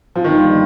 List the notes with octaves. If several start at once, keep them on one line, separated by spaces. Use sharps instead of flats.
F3
G1 G2 D#3 G3 A#3 F4